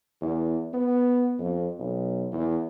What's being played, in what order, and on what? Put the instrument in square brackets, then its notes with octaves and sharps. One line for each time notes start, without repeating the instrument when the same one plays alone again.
[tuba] E2
B3
F2
B1
E2